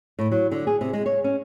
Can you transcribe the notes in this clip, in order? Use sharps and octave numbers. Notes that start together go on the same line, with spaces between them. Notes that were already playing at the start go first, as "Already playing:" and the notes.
A2
F#3
D3
G#4
C3
G#3
C#5
C#4